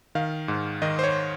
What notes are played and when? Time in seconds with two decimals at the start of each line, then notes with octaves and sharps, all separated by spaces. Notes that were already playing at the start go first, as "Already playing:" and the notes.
0.15 D#3 F5
0.48 G#2
0.82 D#3 D#5
0.99 C5
1.04 C#5